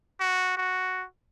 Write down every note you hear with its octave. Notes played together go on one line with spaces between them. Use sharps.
F#4
F#4